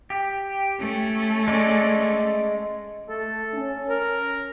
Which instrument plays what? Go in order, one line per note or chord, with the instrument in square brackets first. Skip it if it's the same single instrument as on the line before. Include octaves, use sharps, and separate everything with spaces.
[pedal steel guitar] G4
[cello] A3 C#4
[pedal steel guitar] G#3 D5
[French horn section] A3 [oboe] A4
[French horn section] C#4
[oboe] A#4